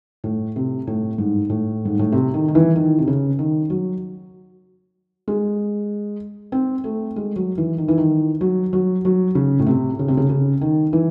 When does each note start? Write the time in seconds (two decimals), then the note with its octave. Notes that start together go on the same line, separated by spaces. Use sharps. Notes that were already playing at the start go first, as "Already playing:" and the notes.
0.24 A2
0.56 C3
0.87 A2
1.18 G#2
1.50 A2
1.85 G#2
1.99 A2
2.12 C3
2.34 D#3
2.48 D#3
2.55 E3
2.76 D#3
2.99 C3
3.07 C#3
3.39 D#3
3.70 F#3
5.28 G#3
6.52 C4
6.84 A3
7.16 G#3
7.36 F#3
7.58 E3
7.78 D#3
7.88 E3
7.98 D#3
8.41 F#3
8.73 F#3
9.05 F#3
9.35 C#3
9.59 A2
9.67 C3
9.99 C#3
10.08 C3
10.17 C#3
10.29 C#3
10.61 D#3
10.93 E3